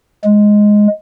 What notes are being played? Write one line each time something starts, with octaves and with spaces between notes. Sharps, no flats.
G#3